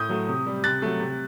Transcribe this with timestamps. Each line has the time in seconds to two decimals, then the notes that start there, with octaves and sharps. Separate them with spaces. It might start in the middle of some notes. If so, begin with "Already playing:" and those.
Already playing: A2 D#6 G6
0.09 F#3 A3
0.28 C3
0.46 G3
0.63 C3 F#6 A6
0.82 F#3 A3
1.00 C3